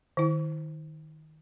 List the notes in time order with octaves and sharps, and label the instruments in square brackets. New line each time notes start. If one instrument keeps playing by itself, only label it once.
[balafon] D#3 E4